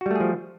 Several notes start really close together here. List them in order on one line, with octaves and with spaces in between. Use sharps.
F#4 G3 A3 G#4 F3